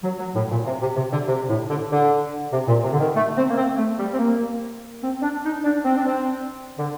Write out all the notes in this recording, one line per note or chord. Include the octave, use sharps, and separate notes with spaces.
F#3
F#3
A2
A#2
C3
C3
C3
D3
C3
A2
D3
D3
C3
A#2
C3
D3
D#3
A3
C4
A#3
C4
A3
G3
C4
A#3
C4
D4
D#4
D4
C4
D4
C4
D3